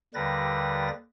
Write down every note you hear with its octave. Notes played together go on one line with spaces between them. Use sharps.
D#2 D3 G3 B4 A6 A#6